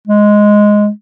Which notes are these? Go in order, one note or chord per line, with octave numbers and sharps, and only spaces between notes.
G#3